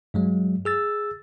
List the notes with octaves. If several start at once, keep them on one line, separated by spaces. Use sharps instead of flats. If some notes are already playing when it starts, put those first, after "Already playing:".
G2 F#3 G#3
G#4 E6 A6